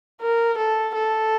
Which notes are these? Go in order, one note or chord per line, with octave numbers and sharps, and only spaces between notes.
A#4
A4
A4